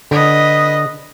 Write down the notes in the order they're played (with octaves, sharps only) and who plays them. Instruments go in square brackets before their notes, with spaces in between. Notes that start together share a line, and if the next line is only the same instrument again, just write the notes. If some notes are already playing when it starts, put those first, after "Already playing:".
[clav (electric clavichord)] D3 [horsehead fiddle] B4 D#5